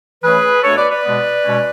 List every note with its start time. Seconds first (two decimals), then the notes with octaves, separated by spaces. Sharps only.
0.22 E3 A3 C#4 G#4 B4
0.63 B2 A3 D4 A4 C#5
0.77 B4 D5
0.90 B4 D5
1.04 B2 G#3 B3
1.44 B2 G#3 C#4